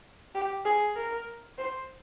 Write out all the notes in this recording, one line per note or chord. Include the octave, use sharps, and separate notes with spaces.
G4
G#4
A#4
C5